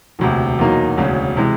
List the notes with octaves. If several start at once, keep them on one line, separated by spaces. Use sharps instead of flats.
E1 D2 C3
E2 B2 F#3 A#3 D#4
E1 D2 C#3
C3 E3 G#3